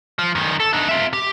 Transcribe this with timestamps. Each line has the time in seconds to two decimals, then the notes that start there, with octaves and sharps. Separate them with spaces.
0.19 F3
0.35 F#2 D#3
0.60 A4
0.73 D4 D#4
0.89 F4 E5
1.13 G4